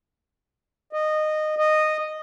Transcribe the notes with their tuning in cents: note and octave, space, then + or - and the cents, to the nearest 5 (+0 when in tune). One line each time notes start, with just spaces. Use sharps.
D#5 -15
D#5 -10